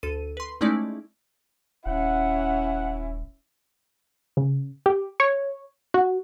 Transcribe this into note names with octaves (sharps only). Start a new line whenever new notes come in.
D2 A4 D#7
B4 C6
G#3 A3 C#4 D#4 E4 D5
D#1 C#4 E4 F#5
C#3
G4
C#5
F#4